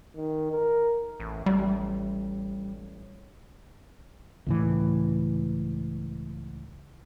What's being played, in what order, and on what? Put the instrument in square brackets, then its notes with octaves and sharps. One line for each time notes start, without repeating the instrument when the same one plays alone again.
[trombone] D#3
A#4
[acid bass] A1
[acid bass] A1 [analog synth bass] G3
[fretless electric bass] C#2 A2 E3